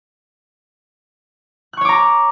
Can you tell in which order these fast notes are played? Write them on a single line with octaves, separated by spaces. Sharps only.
F#6 C#6 C#5 D6 A#5